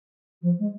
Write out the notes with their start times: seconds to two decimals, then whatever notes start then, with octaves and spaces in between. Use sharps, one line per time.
0.41 F3
0.58 G#3